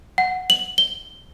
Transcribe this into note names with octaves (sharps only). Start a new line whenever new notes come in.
F#5
F#7
G7